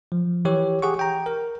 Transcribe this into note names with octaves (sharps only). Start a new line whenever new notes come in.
F3
E3 G4 C#5
G4 G#4 F#5 C#6
G5 A#5
A#4